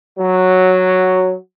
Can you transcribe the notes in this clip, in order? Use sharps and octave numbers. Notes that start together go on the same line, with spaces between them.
F#3